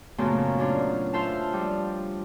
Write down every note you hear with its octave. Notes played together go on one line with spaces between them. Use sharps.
F#2 A#2 C#3 F3 A3 B3
F#3 C#4 D4 F4
F4 C5 E5 F5 A5
F3 G3